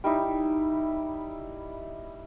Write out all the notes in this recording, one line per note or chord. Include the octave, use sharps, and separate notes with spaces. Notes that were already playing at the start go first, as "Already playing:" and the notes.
G3 D#4 E4